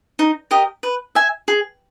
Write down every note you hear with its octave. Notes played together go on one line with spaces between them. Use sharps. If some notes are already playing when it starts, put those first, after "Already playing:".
D#4
G4 A#4 D#5
B4
E5 G#5
G#4